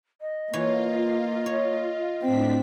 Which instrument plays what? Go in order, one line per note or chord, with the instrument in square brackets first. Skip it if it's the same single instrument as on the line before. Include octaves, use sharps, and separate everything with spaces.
[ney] D#5
[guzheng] E3 C#5 [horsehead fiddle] A#3 [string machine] F4
[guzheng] C#5
[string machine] A2 D4 B6 [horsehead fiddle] C4